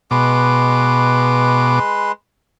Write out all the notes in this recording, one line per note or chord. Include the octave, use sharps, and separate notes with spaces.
B2 G#3 B4 C6 D6